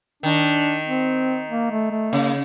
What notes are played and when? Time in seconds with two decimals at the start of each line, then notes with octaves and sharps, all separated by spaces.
0.23 D#3 D4
0.86 C4
1.49 A#3
1.71 A3
1.91 A3
2.13 C#3 A#3